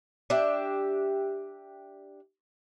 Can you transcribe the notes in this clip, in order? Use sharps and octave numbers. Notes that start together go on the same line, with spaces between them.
D4 G4 E5